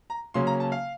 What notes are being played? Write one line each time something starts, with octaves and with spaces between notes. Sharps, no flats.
A#5
C#3 F#3 A#3 C#4 C6
A#5
A5
F5